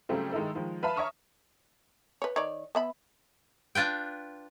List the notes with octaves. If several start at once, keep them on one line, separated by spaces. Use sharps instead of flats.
C#3 F#3 G3 A3 C4
D#3 G#3 D#4 E4 A4
D#3 F3 G#3
B4 E5 F5 A5 B5
C#5 E5 A#5 C#6 D#6 F6
B4 C#5
D#3 C#5 D5
B3 E5 B5
D4 F4 B4 G5